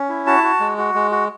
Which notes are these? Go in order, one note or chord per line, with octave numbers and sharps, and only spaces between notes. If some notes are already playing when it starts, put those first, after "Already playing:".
Already playing: C#4
E4
F#4 A5
F#4
G#3
F#4
G#3
F#4